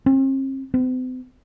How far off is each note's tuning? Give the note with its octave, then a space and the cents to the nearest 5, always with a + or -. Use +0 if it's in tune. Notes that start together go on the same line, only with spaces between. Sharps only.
C4 +45
C4 -45